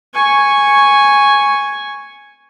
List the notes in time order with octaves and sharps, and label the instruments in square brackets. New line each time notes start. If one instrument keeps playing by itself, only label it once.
[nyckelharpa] G#5 C#6